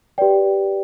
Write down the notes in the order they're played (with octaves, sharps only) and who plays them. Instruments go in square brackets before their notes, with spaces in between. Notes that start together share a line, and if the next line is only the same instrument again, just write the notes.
[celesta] G4 B4 D5 G5